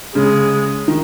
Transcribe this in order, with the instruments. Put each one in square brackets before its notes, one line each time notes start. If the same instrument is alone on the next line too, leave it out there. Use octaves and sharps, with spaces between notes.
[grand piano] C#3 [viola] G#3
[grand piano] D#3